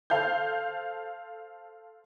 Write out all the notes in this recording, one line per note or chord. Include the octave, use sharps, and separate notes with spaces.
A4 C5 F5 A5 G6